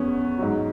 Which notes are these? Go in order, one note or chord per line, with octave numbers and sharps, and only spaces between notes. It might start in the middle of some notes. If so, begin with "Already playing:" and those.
Already playing: E2 B3 C#4
G#2 F#3